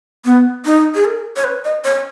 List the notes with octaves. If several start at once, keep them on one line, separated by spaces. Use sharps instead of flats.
B3
D#4
G#4
A#4
C#5
B4
D#5
C#5